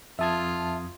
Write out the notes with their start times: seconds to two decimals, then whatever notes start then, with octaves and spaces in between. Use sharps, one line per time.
0.19 F2 F4 E5 A5 D#6 G#6